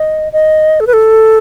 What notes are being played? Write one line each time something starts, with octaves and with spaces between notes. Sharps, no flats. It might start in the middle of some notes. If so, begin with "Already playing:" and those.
Already playing: D#5
D#5
A4
B4
A4